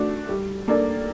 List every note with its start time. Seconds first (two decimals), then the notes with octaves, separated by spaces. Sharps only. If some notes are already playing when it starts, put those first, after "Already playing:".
Already playing: A3 D4 F#4
0.29 G3
0.68 A#3 D4 A4 D5